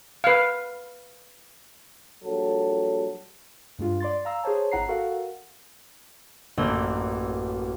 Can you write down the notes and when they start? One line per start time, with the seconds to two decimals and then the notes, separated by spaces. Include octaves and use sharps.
0.24 B4 F5
2.23 A#1 F#3 G3 A4
3.79 G2 G#3 F4
4.00 D5 C6 A6
4.25 F5 A#5 E6
4.43 G#4 C5 C#5 A5
4.71 G#1 E4 F#5 A#5 C7
4.89 F#4 A4 A#4 F5 F#5
6.57 A1 F#2 A#3 E6 G6